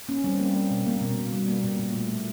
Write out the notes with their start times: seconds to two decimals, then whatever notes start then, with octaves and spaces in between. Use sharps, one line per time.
0.08 A#3 C#4
0.24 G3 C4
0.40 G3 A#3
0.55 A#3
0.71 B2
0.87 A#3
1.01 B2
1.17 B2
1.33 G3
1.48 A#3
1.64 A#2
1.79 A#2
1.95 A3
2.10 A#2